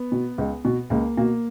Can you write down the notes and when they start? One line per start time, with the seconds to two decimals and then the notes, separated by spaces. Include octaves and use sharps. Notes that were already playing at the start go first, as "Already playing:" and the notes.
Already playing: B3
0.12 B2
0.38 C#2
0.65 B2
0.90 C#2 A#3
1.17 B2 A#3